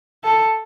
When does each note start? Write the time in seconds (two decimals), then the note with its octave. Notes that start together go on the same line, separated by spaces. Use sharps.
0.24 A4